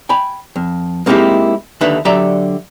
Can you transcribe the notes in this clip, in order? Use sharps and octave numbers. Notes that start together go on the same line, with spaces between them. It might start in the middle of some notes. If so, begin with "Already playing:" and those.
G5 G#5 B5
F2
G#3 A#3 C4 D#4 E4 G4
D#2 D3 D4 D#4 B4 E5
D3 F#3 G4 D5 E5 A#5